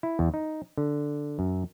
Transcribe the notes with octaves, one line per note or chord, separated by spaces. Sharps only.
E4
E2
D#4
D3
F#2